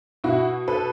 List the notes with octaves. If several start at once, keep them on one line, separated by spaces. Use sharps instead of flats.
B2 E4 F#4
A4 B4